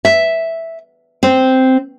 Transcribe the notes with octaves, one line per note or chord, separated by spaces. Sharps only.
E5
C4